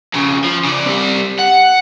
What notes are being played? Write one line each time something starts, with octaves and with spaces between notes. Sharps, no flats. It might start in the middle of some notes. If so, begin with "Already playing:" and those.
F2 C#3
F3
C#3 D5
G3 C4
F#5